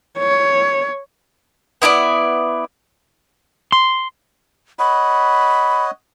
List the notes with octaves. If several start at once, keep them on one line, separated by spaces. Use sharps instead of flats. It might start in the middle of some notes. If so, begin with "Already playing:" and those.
C#5
B3 E4 A#4 D5
C6
C#5 D#5 F#5 B5